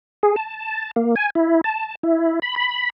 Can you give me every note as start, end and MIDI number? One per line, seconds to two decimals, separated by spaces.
0.23 0.36 68
0.36 0.91 81
0.96 1.15 58
1.16 1.30 80
1.35 1.61 64
1.64 1.95 81
2.03 2.39 64
2.42 2.55 83
2.56 2.90 83